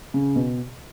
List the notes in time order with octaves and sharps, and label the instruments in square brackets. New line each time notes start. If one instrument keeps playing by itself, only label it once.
[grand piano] C#3
B2